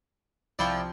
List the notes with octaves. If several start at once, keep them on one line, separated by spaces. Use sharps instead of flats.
C2 F3 E4 D5 G5